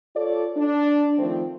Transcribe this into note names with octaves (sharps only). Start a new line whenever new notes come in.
F4 A4 C#5 D5
D4
D#3 F3 A3 C4